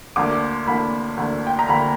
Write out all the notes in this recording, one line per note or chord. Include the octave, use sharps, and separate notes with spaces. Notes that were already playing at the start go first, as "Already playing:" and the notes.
D2 D3 A#3 D6
D2 D3 A#3 B5
D2 D3 A#3
G5
A#5
D2 D3 A#3 B5